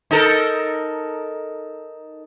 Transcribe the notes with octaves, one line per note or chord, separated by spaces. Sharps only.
D#4 A4 A#4